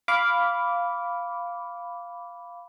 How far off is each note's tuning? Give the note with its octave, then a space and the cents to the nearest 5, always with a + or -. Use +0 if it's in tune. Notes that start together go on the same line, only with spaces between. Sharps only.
F5 +0 B5 +0 D6 -15